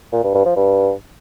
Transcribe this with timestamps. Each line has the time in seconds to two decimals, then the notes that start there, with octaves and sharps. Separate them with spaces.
0.13 A#2
0.23 G2
0.34 G2
0.45 F3
0.56 G2